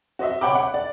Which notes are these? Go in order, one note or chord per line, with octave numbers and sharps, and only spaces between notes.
F#4 C5 D#5 E5
C#5 F#5 G5 B5 D6
F#5
D5